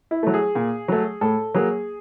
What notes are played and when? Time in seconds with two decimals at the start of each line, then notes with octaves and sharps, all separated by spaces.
0.11 E4
0.23 F#3 A3
0.34 G#4
0.55 A#2
0.88 F#3 A3
1.21 A2 A4
1.55 F#3 A#3 G#4